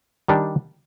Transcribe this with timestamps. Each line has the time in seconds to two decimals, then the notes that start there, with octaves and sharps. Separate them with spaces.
0.28 D#3 G3 D4